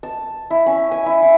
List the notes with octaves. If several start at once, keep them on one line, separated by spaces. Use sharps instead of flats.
A5
E4
C#4
G#5
E4
E4